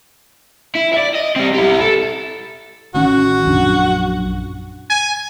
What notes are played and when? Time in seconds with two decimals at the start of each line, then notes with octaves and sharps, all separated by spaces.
0.75 E4
0.94 D5 E5
1.15 D#5
1.36 G3 C4
1.54 E4 G4
1.81 A4
2.94 A1 D#3 C#4 F#4
3.46 A#1 F#2 D4
4.90 G#5